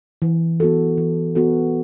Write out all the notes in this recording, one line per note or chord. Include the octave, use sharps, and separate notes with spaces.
E3
B3 F#4 A4
E3
B3 F#4 A4